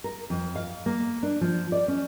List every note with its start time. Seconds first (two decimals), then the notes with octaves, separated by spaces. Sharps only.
0.04 A#4
0.30 F2
0.56 F5
0.86 A#3
1.23 D4
1.41 F3
1.72 D5
1.88 C#4